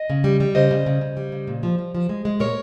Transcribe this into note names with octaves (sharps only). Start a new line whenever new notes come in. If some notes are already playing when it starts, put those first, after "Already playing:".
Already playing: D#5
C#3
G3
G3
C#3 C5 D#5
C#3
C#3
C#3
G3
C#3
A#2
F3
F3
F3
G#3
G#3
A#2 A#4 C#5